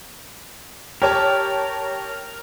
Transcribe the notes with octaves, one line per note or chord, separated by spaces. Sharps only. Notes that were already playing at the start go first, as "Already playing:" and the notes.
G4 A#4 C#5 A5